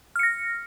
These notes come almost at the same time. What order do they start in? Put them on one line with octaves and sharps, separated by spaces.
F6 C#7 A#6